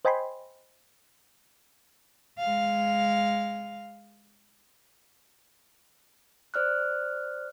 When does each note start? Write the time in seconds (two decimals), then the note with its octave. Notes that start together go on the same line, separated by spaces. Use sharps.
0.05 C5 D#5 G5 G#5 B5 C6
2.38 G#3 F5
6.54 C5 D5 F6 F#6